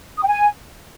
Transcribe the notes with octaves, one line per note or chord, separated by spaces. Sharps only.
D#6
G5
G#5